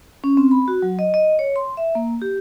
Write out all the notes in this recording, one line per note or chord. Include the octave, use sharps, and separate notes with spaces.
C#4
C4
B5
F#4
F#3
D#5
D#5
C#5
C6
E5
A#3
G4